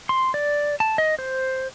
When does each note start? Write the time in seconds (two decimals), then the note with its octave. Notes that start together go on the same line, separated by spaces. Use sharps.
0.09 C6
0.34 D5
0.80 A5
0.98 D#5
1.19 C5